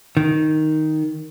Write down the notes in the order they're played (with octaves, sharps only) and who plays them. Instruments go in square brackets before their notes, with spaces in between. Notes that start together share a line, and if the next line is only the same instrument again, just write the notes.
[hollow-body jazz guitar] D#3